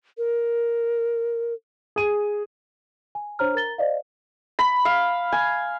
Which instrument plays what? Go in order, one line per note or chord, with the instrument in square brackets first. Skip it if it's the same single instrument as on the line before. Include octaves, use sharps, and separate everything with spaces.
[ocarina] A#4
[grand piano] G#4 D#7
[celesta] G#5
D4 C5 C#5 A#5 F6
A#4 A#5 A6 G7
C5 D5 D#5 F5
[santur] B5
F5
G#5